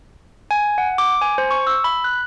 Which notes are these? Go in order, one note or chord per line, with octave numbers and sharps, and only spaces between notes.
G#5
F#5
D6
G#5
C5
C#6
E6
B5
F#6